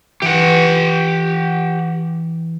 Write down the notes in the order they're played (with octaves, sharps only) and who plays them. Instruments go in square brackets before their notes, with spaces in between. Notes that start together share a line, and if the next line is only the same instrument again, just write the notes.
[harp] E3 [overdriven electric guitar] G4 F#5